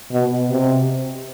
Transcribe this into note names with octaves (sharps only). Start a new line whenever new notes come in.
B2
C3